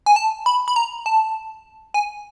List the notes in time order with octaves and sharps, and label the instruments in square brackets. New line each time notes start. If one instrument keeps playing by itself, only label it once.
[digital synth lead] G#5
A5
B5
B5
A#5
A5
G#5